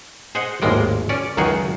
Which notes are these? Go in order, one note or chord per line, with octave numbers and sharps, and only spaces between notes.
G#4 C5 D#5 F#5
G#1 D#2 A2 G#3 A#3 D5
C#4 D5
C#2 F#2 D#3 D#4 F#4 G#4